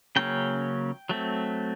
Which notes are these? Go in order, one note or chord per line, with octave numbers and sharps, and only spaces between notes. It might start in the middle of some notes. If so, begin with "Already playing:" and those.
C#3 F#3 A#3 C#4 G5
F#3 A3 C4